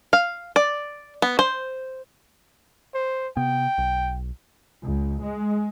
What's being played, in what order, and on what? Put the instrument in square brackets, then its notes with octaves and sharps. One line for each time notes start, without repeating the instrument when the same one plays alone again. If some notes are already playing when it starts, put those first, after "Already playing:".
[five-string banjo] F5
D5
B3
C5
[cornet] C5
[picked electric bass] C3 B3 [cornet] G5
[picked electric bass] B1
[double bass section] C#2
G#3